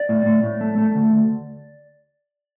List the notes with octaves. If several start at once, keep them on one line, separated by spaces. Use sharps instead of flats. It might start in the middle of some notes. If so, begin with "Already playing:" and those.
Already playing: D5
A2
A2
A2
A3
A3
D2
D2